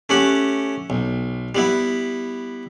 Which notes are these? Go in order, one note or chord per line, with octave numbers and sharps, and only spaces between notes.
A3 C#4 G4 F#5
B1
G3 B3 E4